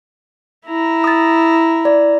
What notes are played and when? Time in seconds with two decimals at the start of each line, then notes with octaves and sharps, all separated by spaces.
0.66 E4 A#5
1.04 D#6 A6
1.85 D5